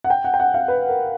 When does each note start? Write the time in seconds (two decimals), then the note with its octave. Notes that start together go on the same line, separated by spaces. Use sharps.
0.04 F#5
0.10 G5
0.24 F#5
0.34 G5
0.40 F#5
0.54 F5
0.68 B4
0.89 A#4